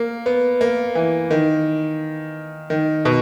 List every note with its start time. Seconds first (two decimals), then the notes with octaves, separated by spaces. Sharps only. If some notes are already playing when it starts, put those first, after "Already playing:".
Already playing: A#3
0.26 B3
0.61 A#3
0.95 E3
1.31 D#3
2.70 D#3
3.05 B2